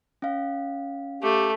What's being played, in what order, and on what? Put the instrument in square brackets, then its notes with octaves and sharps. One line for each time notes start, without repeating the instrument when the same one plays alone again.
[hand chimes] C#4 F5
[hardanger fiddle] A3 [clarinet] G4